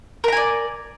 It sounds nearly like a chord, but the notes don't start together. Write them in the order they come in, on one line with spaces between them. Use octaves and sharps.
A#4 A#5 G#5 D5